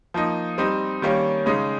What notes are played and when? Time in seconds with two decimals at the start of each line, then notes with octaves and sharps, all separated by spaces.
0.14 F3 A#3 D#4
0.58 G3 C4 D#4
1.02 D#3 G3 A#3 C#4
1.46 C#3 G#3 D#4